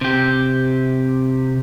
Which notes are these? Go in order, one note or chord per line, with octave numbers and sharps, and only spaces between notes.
C3 G4